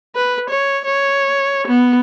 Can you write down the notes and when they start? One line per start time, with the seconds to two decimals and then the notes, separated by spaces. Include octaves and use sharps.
0.15 B4
0.49 C#5
0.85 C#5
1.67 B3